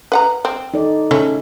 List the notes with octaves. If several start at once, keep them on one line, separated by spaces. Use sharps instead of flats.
B4 F#5 A#5
C4
D#4 A4 D5
C#3 A3 C#4 E4